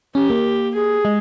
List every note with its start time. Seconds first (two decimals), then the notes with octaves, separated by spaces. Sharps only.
0.15 C#4 G4
0.30 A#3
0.75 G#4
1.05 G#3